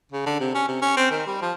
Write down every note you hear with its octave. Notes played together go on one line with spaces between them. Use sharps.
C#3
D3
C3
C#4
C3
C#4
C4
D#3
G3
F3